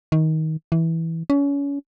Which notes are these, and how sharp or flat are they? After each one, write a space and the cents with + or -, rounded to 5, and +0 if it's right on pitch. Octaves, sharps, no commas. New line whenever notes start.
D#3 +20
E3 -10
C#4 +30